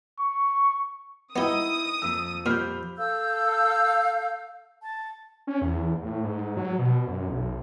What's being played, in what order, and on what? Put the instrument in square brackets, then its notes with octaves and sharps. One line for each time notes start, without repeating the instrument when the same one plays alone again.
[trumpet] C#6
[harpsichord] B3 G4 [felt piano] D#4 E4 D#5 [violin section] D#6
[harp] F2 A#3 [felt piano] E6
[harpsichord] A#2 [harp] G4 C5 B5 [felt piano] F6 G6
[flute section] A4 F5 E6 G6
A5
[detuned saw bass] C#4
E2
A2
G#2
F#3
B2
F#2
B1